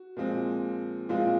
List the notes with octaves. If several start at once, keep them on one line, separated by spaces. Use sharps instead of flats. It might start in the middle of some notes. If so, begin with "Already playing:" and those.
Already playing: F#4
A#2 F3 G#3 C4
A#2 F3 G#3 C4 F4